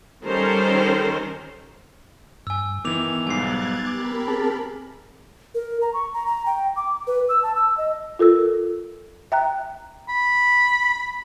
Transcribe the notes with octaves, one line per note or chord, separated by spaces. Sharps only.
D#3 G3 C#4 A4 A#4 C5
G2 G#5 E6
D#3 E3 B3 D6 F7
B1 G#2 G3 G#5 F#6 G#6 A6 C7
G4 A#4 B5 D6
C4 G#4 A5
A#4
A#5
C#6
A#5
A#5
G5
D6
B4
E6
A5
E6
D#5
F4 A4 A#4 E6
E5 G5 A#5 F#6
B5